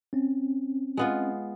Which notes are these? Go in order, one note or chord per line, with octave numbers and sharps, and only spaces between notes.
C4 C#4
G#3 B3 F4